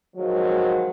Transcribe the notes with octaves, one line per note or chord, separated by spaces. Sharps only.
D#3 F3 F#3 G#3